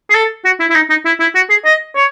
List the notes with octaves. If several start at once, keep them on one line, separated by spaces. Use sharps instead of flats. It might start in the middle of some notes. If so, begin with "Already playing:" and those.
G#4
A4
F#4
E4
E4
D#4
D#4
E4
E4
F#4
G#4
D#5
C#5